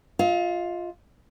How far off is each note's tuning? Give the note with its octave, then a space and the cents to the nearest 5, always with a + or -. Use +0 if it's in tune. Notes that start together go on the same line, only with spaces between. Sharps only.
F4 +5 D#5 +45